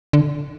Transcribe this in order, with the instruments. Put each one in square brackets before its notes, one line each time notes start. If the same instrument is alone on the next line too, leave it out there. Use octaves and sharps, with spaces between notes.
[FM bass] D3